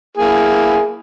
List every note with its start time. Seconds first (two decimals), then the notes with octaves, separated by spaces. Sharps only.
0.17 A#3 E4 G#4